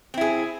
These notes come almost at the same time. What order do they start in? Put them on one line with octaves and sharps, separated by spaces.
C4 E4 G#4